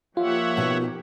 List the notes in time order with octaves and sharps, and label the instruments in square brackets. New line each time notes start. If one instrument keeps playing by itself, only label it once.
[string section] F3 A#3 G4 [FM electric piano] F4 [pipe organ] C#5 E5 F#5
[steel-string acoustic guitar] B2 D#4